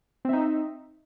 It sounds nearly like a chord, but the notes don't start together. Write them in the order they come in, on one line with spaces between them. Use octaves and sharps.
C4 E5 D#4